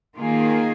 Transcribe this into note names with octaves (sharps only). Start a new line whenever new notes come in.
D#3 A#3 F4 G#4